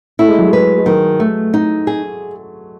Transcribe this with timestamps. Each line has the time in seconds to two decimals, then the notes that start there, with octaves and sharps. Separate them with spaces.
0.19 A3 E4
0.29 G#3
0.39 F#3
0.48 G#3
0.53 B4
0.78 G#3
0.86 D#3 F#3
1.20 A3
1.54 D#4
1.87 G#4